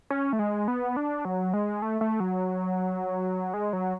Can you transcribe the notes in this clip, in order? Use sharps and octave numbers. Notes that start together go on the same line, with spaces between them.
C#4
A3
G#3
B3
D4
F#3
G#3
A3
A3
F#3
G#3
F#3